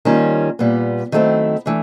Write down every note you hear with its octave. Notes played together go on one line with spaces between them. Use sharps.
D#3 G3 A#3 C#4 F4
A#2 G3 B3
D#3 F#3 A3 C4 E4
E3 A3 D4